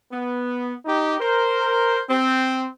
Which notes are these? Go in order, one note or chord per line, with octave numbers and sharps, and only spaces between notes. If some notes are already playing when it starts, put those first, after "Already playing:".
B3
D#4 G4
A#4 C5
C4